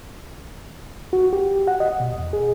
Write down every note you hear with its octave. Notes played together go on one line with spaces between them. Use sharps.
F#4
G4
F#5
D#5
B2
E2
G#4